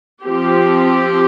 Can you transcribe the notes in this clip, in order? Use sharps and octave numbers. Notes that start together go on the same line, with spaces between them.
F3 C4 G4